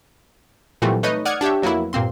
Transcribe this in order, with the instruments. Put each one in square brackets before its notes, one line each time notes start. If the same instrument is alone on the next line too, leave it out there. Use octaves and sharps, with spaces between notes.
[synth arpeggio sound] A#2 E3 F#3 G3 A3 C4
A3 D#4 B4 C#5 D#5
D5 F#5 D#6 F6 G#6 C#7
D4 G4 C#5 E5
F2 F#3 A#3 B3 E4
G2 A#2 A#3 C4 C6